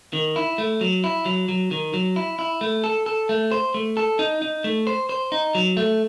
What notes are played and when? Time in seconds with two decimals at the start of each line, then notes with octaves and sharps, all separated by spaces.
0.13 D#3
0.36 E4
0.58 A3
0.81 F#3
1.04 E4
1.25 F#3
1.49 F#3
1.71 D#3
1.94 F#3
2.16 E4
2.39 E4
2.61 A3
2.84 A4
3.06 A4
3.29 A3
3.52 C5
3.74 A3
3.97 A4
4.19 D#4
4.42 D#4
4.64 A3
4.87 C5
5.09 C5
5.32 D#4
5.55 F#3
5.77 A3